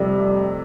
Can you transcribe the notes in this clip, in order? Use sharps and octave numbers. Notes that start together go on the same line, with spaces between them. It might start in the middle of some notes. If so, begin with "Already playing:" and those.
Already playing: F2 C3 G3 A3
A3